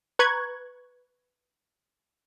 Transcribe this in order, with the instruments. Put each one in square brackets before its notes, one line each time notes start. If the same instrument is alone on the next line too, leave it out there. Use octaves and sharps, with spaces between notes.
[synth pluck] B4 A#5 C#6 F#6 G#6